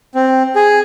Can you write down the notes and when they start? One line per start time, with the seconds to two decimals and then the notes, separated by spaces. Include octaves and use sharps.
0.15 C4
0.56 G#4